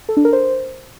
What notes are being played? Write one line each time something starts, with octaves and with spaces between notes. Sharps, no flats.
A4
D4
A#4
C5